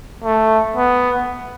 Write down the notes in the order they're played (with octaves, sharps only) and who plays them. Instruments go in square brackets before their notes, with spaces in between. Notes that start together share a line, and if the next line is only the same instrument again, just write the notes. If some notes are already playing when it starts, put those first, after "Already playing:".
[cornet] A3
B3